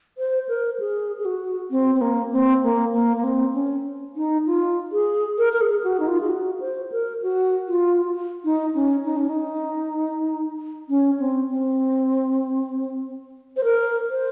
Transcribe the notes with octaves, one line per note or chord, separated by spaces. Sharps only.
C5
A#4
G#4
G#4
F#4
C4
C4
A#3
C4
A#3
A#3
A#3
C4
C#4
D#4
F4
G#4
A#4
A#4
G#4
F#4
D#4
F4
G#4
F#4
C5
A#4
F#4
F4
D#4
C#4
D#4
C#4
D#4
C#4
C4
C4
C5
A#4
C5